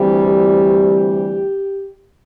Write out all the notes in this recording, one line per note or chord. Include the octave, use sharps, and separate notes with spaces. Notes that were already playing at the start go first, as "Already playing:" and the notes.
Already playing: D2 C3 E3 G3
G4